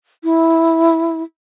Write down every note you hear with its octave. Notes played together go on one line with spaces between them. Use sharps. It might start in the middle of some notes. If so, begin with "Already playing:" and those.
E4